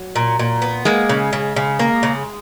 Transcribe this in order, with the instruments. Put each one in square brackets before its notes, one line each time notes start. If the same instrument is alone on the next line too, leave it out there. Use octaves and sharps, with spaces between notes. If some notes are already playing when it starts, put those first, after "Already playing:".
Already playing: [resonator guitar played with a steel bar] F#3
[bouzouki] A#2
A#2
B3
[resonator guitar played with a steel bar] G#3 [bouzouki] A#3
[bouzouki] C#3
C#3
C#3
A#3
C#3